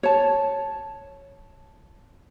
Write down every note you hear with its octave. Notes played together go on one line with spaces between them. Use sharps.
C#5 A5